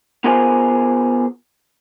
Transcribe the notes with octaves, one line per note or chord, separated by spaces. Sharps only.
B3 F4 G#4 A#4 C5 G#5